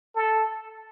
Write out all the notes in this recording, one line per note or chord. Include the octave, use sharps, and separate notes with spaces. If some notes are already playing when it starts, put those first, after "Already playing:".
A4